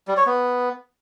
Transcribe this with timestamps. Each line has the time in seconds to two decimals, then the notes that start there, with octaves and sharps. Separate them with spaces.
0.08 G3
0.17 C#5
0.26 B3